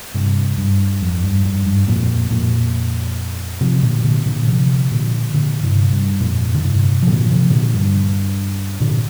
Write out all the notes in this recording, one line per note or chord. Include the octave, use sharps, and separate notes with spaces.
G2 C3
G2
F2
G2
G2
G2
F2 A#2
F2 A#2
C3 F3
A#2 D3
A#2 D3
A#2 D3
C3 F3
A#2 D3
A#2 D3
G2 C3
G2
F2 A#2
D3
G2 C3
F3
A#2 D3
C3 F3
A#2 D3
G2
A#2 D3